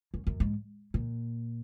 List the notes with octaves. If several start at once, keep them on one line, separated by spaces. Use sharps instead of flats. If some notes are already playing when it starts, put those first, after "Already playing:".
F#2
F#2
G#2
A#2